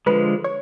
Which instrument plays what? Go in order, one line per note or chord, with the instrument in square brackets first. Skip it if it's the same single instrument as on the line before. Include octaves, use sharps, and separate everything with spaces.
[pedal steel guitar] D3 F3 G#3 [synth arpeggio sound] B4
[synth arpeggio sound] C#5